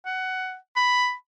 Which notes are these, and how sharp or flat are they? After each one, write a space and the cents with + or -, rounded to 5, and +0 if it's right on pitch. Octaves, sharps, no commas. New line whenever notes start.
F#5 +15
B5 +5